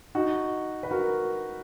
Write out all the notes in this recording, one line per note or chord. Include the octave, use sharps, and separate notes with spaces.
D#4 F#4
B4
F#4 A#4